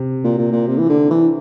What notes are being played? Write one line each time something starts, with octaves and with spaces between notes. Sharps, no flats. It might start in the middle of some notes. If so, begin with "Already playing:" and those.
Already playing: C3
A#2
A#2
A#2
C3
E3
D3
E3